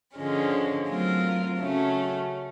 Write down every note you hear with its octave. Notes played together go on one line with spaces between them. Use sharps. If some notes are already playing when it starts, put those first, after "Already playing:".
D3 F3 G#3 C#4
F#3 A3 C4 F4 A#4
C#3 F#3 A3 C#4